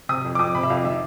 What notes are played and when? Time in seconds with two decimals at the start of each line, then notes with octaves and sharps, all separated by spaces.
0.09 C3 D#6
0.24 F2
0.35 D6
0.39 F2 D#6
0.55 C3 B5
0.63 E5
0.70 F2 F5
0.85 D#3 E5